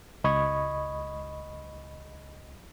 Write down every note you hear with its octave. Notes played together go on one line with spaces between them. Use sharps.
C#2 D#5 B5 C#6 D#6 G#6